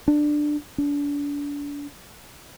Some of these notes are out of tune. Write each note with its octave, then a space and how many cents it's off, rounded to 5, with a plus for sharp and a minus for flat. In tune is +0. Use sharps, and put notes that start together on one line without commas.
D4 +15
D4 -35